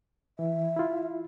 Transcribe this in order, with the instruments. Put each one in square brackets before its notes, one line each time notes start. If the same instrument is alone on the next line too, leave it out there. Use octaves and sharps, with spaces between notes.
[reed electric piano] E3 [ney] E5
[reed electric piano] E4 F4